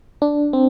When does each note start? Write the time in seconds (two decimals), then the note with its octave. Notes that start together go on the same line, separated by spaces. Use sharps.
0.22 D4
0.53 C4